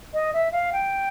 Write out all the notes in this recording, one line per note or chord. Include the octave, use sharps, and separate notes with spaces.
D#5
E5
F5
G5